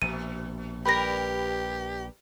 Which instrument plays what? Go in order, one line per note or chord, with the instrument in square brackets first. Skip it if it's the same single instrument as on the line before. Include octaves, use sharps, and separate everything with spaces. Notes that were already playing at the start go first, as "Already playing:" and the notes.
[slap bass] A#1 [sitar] B2 [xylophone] D#7
[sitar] G3 A#4 B4 [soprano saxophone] G4 [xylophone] B5 A#6